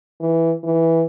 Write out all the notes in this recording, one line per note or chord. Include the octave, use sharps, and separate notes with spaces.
E3
E3